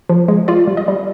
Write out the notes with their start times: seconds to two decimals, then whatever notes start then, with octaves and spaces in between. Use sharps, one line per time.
0.09 F3
0.28 G#3
0.48 F4 D5
0.67 G3
0.77 D#5
0.88 G3